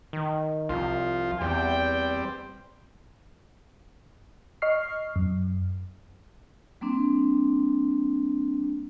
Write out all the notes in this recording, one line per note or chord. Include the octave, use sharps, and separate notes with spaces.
D#3
C2 F3 F4
E2 G3 C4 G5
D#5 C#6 F6 C7
F#2
G3 A#3 C4 D4